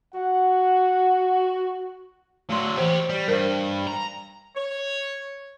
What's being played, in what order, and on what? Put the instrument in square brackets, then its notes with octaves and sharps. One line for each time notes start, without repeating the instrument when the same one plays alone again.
[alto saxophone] F#4 [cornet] F#5
[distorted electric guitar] D3 F#3 [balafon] A3 C6
[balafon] E3 C5 [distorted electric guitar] G4 C#5
[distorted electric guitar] G3
[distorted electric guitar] G2 [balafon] A#4 C5
[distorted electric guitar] A#5
[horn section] C#5